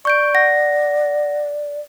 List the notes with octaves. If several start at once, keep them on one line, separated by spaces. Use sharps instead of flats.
D5 C#6 G6 D7
F#5 A#6